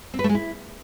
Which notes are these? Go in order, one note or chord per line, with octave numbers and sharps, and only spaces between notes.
C4
B4
A3
G#3
E4